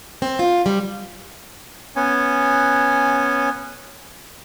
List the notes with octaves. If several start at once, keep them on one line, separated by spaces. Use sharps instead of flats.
C4
F4
G3
B3 C#4 G#5